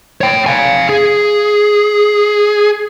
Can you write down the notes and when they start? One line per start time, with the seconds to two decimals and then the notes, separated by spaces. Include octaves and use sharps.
0.21 C#5 G5
0.46 F5 G#5
0.90 G#4